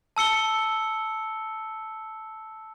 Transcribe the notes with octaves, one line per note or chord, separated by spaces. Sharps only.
A5 E6 C#7 G7